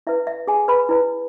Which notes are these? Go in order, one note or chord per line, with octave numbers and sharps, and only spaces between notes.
E4 B4 E5
E5
G#4 G#5
B4 B5
E4 B4